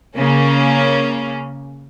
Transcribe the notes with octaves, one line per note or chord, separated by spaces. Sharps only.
C#3 A#3 C#4